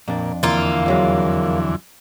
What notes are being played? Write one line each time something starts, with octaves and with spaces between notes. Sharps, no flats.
F2 A#2 D4
E2 D3 E3 A#3 F4
F2 F#3 G#3